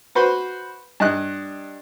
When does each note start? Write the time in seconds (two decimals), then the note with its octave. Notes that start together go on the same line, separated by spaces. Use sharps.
0.15 F#4 B4 C5
1.00 G2 D#5 F#6